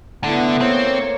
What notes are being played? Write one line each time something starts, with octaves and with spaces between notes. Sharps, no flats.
D3 A3 B3 E4
A#3 C4 C#5